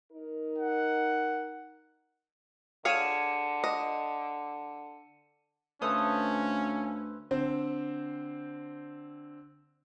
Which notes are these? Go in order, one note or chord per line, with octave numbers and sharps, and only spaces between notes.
D#4 A#4
F#5
D3 G#4 C#5 F5 C#7 D#7 E7
D#5
D2 C#4 A4 B4 C5 E5 F5 D#6
D3 C4 C5